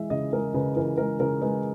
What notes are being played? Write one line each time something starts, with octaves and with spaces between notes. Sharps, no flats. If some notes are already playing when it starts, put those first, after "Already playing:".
Already playing: E3 G#3 E5
C#3 D#5
G#3 A#4
C#3 B4
E3 A#4
G#3 A#4
C#3 A#4
G#3 B4